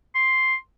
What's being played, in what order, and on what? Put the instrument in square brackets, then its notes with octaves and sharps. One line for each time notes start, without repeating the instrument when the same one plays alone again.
[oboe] C6